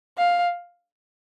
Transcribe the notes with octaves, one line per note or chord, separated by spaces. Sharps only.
F5